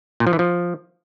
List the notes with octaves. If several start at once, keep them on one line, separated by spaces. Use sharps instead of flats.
A#2
F3
E3
F3